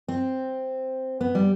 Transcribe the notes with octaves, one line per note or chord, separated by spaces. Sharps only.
C4
B3
G3